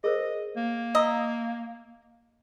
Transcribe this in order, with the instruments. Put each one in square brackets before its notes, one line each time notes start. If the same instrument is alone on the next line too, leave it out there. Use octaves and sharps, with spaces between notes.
[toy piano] G#4 A#4 C5 [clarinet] D#5
[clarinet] A#3
[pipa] D#5 [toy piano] F5 A#5 E6